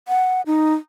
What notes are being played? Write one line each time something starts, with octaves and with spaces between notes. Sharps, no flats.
F#5
D#4